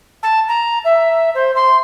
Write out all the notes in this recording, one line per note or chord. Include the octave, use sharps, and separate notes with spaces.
A5
A#5
E5
C5
C6